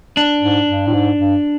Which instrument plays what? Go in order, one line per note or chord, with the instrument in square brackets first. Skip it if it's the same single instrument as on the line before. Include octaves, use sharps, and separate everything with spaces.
[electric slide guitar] D4
[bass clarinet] G#2
G2
A2
G#2
G2